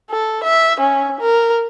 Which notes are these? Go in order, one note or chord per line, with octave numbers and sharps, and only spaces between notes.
A4
E5
C#4
A#4